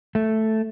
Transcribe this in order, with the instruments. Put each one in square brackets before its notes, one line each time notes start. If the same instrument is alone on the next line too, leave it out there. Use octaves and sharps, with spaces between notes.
[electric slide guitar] A3